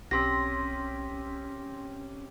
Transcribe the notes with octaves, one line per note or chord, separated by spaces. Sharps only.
B1 C4 C#4 G4 C6 A#6 B6